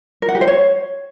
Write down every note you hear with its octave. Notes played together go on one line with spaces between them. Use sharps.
A#4
F#5
G4
C5
C#5